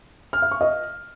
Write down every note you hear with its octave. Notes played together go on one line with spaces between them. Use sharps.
F6
E5
C#6
D#5